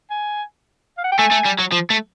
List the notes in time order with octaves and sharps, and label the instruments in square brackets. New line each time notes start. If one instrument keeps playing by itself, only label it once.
[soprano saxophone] G#5
F5
F#5
G5
[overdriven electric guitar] A3 [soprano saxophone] G#5
[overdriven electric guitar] A3
G3
F#3
F3
A3